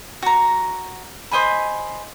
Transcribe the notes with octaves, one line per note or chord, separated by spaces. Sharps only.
F#4 A#5
C5 D#5 G#5 B5